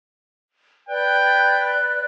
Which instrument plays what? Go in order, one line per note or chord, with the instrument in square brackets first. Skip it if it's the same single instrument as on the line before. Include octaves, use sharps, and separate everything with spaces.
[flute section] B4 D5 F#6 [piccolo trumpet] G5